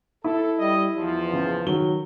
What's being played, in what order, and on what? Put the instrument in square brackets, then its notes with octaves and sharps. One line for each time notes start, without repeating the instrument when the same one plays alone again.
[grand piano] E4 [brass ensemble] A4
[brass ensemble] G3 D#5
E2 F3
[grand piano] C#3
D#3 F#3 G7